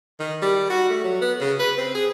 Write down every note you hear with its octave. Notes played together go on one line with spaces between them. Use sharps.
D#3
G3
F#4
A3
F#3
B3
C#3
B4
C4
G#4